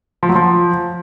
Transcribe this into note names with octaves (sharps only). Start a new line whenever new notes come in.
F3
F#3
F3